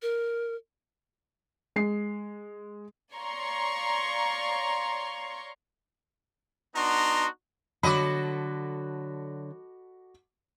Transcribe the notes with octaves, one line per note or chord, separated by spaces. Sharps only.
A#4
G#3 C7
C#5 D5 F5 A#5 C6 C#6
B3 D4 D#4 F#4 A#5 C6
D3 F#3 F#4 A4 D#5 B5 D6